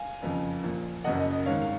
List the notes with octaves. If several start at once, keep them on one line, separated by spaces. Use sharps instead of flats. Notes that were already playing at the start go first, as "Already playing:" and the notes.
Already playing: F5 G#5
F#1 F2 C#3
A#1 A#2
F#1 F#2 C#3 D#5 F#5
D#5
D#5
G#1 G#2 D#3 C#5 F5
F5